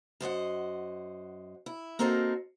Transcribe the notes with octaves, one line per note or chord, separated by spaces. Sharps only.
F#2 C5 D#5 F#5
E4
A#3 C4 D#4 F#4 A4 A#4